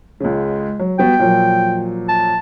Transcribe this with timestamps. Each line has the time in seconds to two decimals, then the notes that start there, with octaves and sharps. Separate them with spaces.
0.20 C#2 C#3 G#3
0.79 F#3
0.99 G3 B3 F#4 G5
1.19 A#2 F3 F#3
2.09 A5